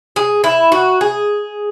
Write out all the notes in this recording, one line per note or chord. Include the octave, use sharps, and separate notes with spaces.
G#4
E4
F#4
G#4